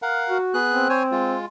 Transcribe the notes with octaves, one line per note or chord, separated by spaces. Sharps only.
A#4 F5 F#5
F#4
B3 G#4 F#6
C4
C5 C#5 G#5
G#3 F4